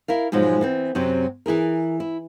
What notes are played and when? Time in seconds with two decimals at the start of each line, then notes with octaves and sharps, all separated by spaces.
0.08 E4 A#4 F5
0.32 G#2 B2 F3 F#3 G#3
0.61 E3 B3 C4
0.95 F#2 C3 F#3 C4
1.46 E3 E4 G#4 A#4
2.00 E4